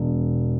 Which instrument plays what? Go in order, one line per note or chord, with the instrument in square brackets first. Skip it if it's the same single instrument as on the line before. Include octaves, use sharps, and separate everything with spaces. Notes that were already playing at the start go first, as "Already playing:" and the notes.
Already playing: [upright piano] E1